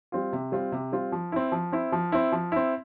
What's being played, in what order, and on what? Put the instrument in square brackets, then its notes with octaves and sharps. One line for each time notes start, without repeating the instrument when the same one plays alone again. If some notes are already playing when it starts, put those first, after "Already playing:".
[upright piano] G3 C4 F4
C3
G3 C4 F4
C3
G3 C4 F4
F3
C4 E4
F3
C4 E4
F3
C4 E4
F3
C4 E4